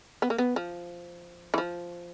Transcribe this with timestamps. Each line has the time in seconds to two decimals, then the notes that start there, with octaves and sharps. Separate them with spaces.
0.22 B3
0.30 A#3
0.38 B3
0.56 F3
1.54 E3
1.58 F3